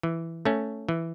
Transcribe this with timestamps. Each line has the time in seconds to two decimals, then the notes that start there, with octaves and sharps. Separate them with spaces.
0.03 E3
0.45 A3 C#4
0.89 E3